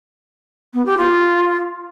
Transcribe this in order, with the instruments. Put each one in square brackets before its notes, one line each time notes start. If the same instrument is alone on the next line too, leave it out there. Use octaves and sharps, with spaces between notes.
[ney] B3
G4
F4